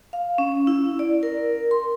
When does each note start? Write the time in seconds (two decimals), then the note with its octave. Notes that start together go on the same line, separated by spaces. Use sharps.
0.13 F5
0.38 C#4
0.67 E4
0.99 D5
1.23 A#4
1.71 C6